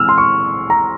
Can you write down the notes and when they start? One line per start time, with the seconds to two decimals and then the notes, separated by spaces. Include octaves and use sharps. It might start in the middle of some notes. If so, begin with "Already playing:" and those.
Already playing: E3 G#3 C4 E6 F6
0.09 C6
0.18 C#6
0.70 A#5